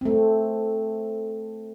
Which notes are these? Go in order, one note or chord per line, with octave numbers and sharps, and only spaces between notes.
A3 C4